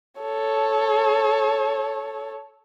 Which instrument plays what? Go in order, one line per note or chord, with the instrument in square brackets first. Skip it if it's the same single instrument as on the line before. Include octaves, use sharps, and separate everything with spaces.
[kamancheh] A4 C#5